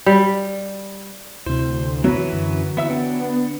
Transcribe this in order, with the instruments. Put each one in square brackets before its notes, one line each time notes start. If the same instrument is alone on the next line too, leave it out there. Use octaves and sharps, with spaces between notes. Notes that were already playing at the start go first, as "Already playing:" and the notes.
[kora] G3
[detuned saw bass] D2 [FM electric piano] C3 E4 [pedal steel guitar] C5
[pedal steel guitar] E3 B4 [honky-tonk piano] F#3
[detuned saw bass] F#2 [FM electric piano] D3
[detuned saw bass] E3 [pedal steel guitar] B3 E5 E6
[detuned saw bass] B3 [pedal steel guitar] D4 F#5 G5